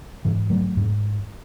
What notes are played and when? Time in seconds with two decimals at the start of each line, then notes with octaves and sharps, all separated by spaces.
0.25 G#2 E3
0.50 F#3 A3
0.77 G#2